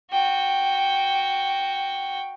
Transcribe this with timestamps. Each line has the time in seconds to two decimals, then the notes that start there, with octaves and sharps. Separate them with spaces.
0.12 F#4 G5